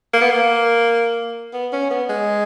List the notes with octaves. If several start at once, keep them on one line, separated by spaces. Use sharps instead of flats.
A#3
B3
A#3
B3
C#4
B3
G#3